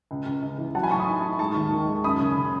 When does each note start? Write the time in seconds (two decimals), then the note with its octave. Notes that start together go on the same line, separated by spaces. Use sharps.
0.11 C#2
0.26 C#2
0.43 C#2
0.58 E3
0.75 F#3 F#5 A5
0.83 G#5 B5
0.91 A2 A5 C#6
0.99 B5 D#6
1.07 D#4
1.23 D#4
1.39 G#3 A5 C#6
1.55 D#2
1.72 D#3
1.88 G#3
2.04 F#2 B5 D#6
2.20 C#3
2.37 C#3